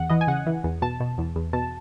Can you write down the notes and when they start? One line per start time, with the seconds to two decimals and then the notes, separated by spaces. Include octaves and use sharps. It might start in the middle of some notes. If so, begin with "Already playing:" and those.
Already playing: E2 F#5
0.09 E3 D#5
0.21 G#5
0.27 C#3 F#5
0.46 E3
0.64 E2
0.82 B2 A5
1.00 B2
1.18 E2
1.36 E2
1.53 B2 A5